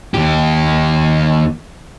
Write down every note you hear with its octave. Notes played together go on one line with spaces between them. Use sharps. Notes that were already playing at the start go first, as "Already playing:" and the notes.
D#2 G4